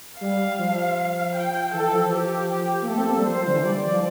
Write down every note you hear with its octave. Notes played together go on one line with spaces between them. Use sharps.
G3 F5
F3
G5
E3 A4
F3
G4
G4
A#3
A3 A4
C4
A#3
G3
F3 C5
F3
D3
E3
G3 D5
F3